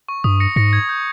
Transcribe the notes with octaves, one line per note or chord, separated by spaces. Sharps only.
C#6
G2 D#6
A#6 C#7
G#2 A#6 C#7
G#6
G6